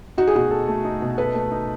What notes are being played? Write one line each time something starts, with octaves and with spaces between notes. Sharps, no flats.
D#4 F#4
G#4
B2 F#4
A4
A3
D#4
B2
A4 B4
A3
D#4